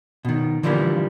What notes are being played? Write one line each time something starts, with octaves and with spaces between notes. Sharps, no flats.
B2 D#3
D3 E3 F3 G3 G#3 A#3